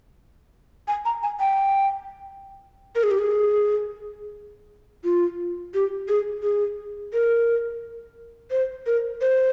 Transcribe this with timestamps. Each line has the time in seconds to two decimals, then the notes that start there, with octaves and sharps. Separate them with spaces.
0.88 G#5
1.05 A#5
1.23 G#5
1.40 G5
2.96 A#4
3.03 G#4
3.11 G4
3.19 G#4
5.04 F4
5.74 G4
6.09 G#4
6.43 G#4
7.13 A#4
8.51 C5
8.86 A#4
9.21 C5